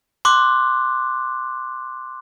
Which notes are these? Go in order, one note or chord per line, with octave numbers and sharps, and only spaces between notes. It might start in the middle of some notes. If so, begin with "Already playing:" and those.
C6 D6 F#6